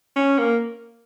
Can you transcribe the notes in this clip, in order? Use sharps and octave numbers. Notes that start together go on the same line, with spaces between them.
C#4
A#3